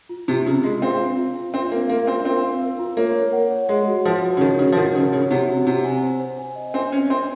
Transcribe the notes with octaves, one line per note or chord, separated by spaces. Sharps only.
F4
C3 F4
C#3 F4
G#3 F4
C4 F5
F4
F4
F4
C4 F4
A#3 F5
A#3 F5
C4 F4
C4 A#4
F5
A#4
F4
A#3 C#5
C#5
F#5
C#5
G#3 F#5
F#4
F3 F#5
F#4
C#3
D#3 C#5
C#3 F#4
F3
D#3 F#5
C#3 F#4
C#3 C#5
C3 F#5
F#4
C3 F#5
G#5
C5
C5
G#5
D#5
C4 G#5
C#4 C5
C4 C6